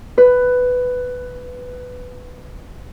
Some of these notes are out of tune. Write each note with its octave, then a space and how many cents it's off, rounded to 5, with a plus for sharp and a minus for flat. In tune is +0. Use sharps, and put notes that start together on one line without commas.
B4 +10